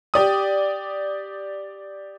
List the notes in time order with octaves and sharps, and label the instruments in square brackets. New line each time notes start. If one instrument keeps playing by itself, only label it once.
[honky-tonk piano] G4 D5 D#6